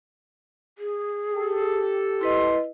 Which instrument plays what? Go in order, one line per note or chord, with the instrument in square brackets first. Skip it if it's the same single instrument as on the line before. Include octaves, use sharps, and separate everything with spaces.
[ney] G#4
[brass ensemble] G4 A4
[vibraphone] E4 B4 D#5 [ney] C6